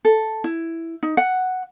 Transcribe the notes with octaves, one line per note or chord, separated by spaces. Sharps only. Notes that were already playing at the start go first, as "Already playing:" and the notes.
A4
E4
D#4
F#5